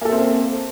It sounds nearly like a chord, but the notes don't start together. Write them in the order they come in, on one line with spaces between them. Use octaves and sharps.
A#3 A4 E5 C4